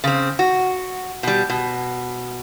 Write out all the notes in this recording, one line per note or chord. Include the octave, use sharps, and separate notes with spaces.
C#3 C4
F#4
B2 G3
B2